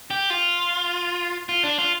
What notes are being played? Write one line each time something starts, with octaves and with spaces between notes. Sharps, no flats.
G4
F4
F4
D4
F4